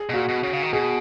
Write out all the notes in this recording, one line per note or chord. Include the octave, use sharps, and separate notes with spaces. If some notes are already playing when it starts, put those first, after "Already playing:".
Already playing: G#4
B2
A#2 F#4
B2
C#3
C#3
D#3
B2 G#4